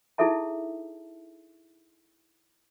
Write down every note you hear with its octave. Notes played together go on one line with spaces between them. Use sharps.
D#4 E4 G#4 A4 E5 A5